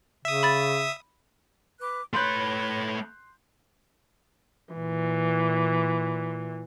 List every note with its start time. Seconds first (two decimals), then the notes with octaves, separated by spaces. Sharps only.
0.25 C#3 E5 D#6
0.43 B5 A6
1.80 B4 D6 F#6
2.13 A3 B4 C#5 B5 C6 F#6 G6
4.73 A#2 E3